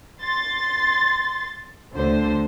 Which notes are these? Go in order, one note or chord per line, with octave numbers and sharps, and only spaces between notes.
C6 A6
D2 D3 C5